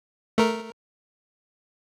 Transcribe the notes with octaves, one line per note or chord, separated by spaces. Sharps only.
A3 A#4